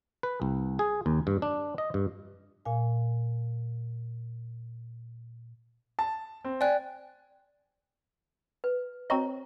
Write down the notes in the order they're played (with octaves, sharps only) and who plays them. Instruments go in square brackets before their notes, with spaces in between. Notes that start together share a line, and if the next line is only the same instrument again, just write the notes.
[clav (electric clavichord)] B4
C2
G#4
D#2
G2
D4
D#5
G2
[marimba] A#2 F5 G#5
[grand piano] A5
C4
[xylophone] D5 G5 F#6 [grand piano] G#5
[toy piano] B4
[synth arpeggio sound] C4 F#4 D#5 [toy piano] C5 C#5 A#5